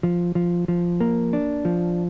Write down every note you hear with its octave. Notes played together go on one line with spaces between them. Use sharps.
F3
F3
F3
A#3
D4
F3